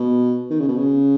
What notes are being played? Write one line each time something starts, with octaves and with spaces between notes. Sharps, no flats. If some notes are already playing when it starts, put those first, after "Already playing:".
Already playing: B2
D#3
C#3
B2
C#3